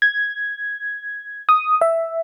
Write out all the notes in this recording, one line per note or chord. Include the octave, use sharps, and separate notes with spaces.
G#6
D#6
E5